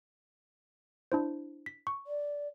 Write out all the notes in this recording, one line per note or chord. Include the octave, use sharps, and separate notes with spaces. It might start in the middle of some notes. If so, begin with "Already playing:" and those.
D4 E4 C5
B6
C#6
D5